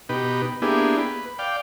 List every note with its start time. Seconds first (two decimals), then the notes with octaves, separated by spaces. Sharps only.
0.09 B2 D#4 G4 B4
0.62 A#3 B3 D4 E4 G4 G#4
0.99 B4
1.39 D5 F5 G5